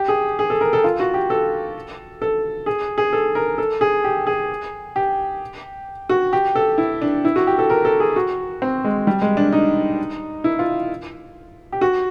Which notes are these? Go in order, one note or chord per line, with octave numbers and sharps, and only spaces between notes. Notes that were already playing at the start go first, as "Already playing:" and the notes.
Already playing: G4
G#4
G#4
A4
A#4
A4
F4
F#4
G4
A4
A4
G#4
G#4
A4
A#4
A4
G#4
G4
G#4
G4
F#4
G4
A4
E4
D4
E4
F#4
G4
A4
A#4
A4
G#4
F#4
C4
G#3
G3
G#3
D4
D#4
E4
F4
G4
F#4